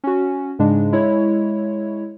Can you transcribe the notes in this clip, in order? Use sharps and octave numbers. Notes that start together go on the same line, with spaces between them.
C#4 F#4
G#2 C#3 G#3 D4
G#3 E4 C#5